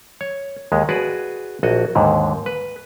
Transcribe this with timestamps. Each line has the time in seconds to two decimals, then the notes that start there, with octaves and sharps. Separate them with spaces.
0.21 C#5
0.72 D#2 G#3
0.89 F#4 G#4 B4 D5
1.63 A#1 F#4 D#5
1.95 D#2 G#2 D3
2.46 B4